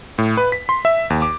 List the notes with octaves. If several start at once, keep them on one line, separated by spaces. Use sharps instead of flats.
A2
B4
B6
C6
E5
D#2
D6